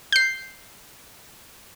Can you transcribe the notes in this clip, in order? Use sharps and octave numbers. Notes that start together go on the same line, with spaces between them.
G6 C7